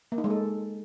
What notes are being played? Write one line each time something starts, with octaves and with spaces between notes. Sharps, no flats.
A#3
D#4
G#3
A4